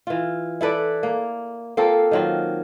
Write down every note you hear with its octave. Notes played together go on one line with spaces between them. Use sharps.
E3 F4
E4 A4 B4 D5
A#3
A#3 C4 F4 A4
D#3 F#3 F4